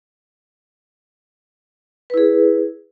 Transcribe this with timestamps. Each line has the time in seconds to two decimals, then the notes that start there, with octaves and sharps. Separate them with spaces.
2.10 B4
2.14 E4
2.17 G#4